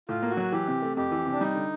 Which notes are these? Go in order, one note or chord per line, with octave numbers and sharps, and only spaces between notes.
A2 F4
A#3
F#4
F#3
E3 G4
C3
A3
F2 G4
E3
C3
D4
G3 D#4
D3